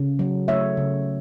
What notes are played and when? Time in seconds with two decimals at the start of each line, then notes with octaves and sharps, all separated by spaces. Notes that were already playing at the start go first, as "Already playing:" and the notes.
Already playing: C#3
0.19 F#3
0.48 A3 C#5 E5
0.77 C#3